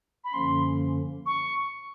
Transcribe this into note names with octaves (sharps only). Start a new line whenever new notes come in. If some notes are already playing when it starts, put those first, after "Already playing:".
B5
F#2 D3 F3 A#3 C#4 C6
C#6